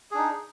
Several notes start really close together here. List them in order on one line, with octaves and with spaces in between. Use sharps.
G#4 D4 D#4